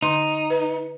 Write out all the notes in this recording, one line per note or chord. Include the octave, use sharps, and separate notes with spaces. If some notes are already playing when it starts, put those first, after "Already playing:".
D3 D#4 C6
B4